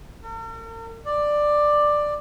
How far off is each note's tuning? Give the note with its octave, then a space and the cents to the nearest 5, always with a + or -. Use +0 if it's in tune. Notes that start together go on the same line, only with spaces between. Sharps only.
A#4 -45
D5 +10